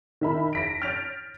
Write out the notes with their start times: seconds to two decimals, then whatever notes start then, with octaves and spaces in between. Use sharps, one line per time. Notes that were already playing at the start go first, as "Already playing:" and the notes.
0.21 D#3 E5 B5
0.53 A#6 B6 D7
0.82 F6 G6 A6 D7 F7